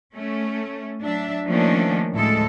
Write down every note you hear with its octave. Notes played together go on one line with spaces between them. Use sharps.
A3 C#4
F#3 D4 E5
D#3 F3 A3 A#3 C#4 D4
D2 A2 G#3 A4